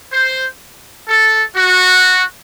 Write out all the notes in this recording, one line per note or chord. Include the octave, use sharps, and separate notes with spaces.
C5
A4
F#4